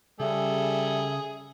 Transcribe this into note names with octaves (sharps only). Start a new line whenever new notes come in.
C#3 G3 G#4 A4 E5